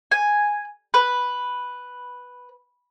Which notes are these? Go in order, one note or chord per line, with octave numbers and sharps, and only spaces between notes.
G#5
B4